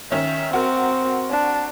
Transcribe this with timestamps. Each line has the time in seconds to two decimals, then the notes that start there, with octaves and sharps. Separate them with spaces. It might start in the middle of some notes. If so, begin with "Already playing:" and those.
0.12 D#3 C#4 E5
0.53 C4 F#4 A#4
1.30 D4